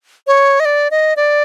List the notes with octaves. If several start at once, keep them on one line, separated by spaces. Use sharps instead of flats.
C#5
D#5
D5
D#5
D5